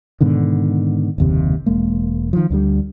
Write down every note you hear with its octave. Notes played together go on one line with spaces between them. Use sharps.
G#2 B2 D3 D#3
F#1 D#2 C3
E1 G#3 A#3
D#3 F3
D2 D3 G3